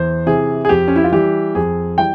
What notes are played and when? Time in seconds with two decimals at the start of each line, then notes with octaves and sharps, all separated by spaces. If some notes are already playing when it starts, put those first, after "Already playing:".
Already playing: E2 C5
0.26 C3 E3 G#4
0.65 G#4
0.69 F2 G4
0.88 C#4
0.96 E4
1.04 F4
1.12 E3 G3 G4
1.55 F2 G#4
1.97 E3 G3 G5